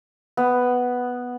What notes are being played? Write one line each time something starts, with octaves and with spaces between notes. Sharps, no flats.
B3